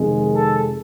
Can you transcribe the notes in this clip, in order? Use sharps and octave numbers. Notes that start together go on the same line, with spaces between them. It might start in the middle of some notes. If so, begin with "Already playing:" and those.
Already playing: F2 C3 D#3 G#3
A4